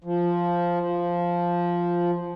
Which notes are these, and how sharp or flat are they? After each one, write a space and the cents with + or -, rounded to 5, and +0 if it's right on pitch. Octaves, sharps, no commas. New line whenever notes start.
F3 -5
F3 -5